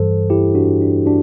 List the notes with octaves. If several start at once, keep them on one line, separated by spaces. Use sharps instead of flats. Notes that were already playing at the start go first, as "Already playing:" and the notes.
Already playing: G2 E3 G3 A4 C5
E4 G4
D4 F#4
D4
D4 F#4